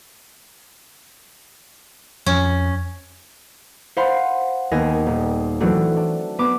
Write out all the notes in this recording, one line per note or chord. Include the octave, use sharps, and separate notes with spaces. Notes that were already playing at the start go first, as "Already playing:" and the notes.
F2 C#4
C5 F5 F#5 B5 C6 C7
D#2 B3 G#5 A#6
D#1
E3 F#3 A3 C4 D4 F#4
D4
B3 D6